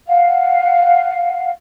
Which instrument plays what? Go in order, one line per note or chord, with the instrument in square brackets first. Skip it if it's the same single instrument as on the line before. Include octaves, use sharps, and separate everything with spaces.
[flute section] F5 F#5